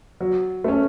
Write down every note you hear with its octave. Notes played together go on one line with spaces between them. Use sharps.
F#3
A3 C#4